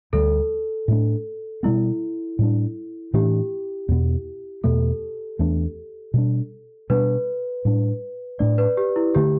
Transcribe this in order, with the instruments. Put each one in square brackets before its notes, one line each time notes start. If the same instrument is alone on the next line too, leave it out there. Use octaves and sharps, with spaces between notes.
[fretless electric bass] D2 D3 G3 [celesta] A4
[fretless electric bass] A2 A3 D4
[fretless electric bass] B2 G3 B3 [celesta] E4
[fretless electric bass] A2 G3 D4
[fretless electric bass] A2 E3 A3 D4 [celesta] G4
[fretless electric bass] E2 B2 B3
[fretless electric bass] E2 B2 A3 [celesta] A4
[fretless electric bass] E2 E3 A3 D4
B2 G3 D4
[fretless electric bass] B2 G3 B3 D4 [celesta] B4
[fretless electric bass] A2 G3 D4
[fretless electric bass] A2 A3 D4 [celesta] D5
[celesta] B4
G4
E4
[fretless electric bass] D3 A3 [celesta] G4